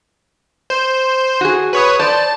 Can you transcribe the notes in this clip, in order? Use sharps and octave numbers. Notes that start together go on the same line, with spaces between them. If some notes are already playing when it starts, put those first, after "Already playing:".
C5
F#4 G#4
B4 C#5 D#6
C5 D5 A5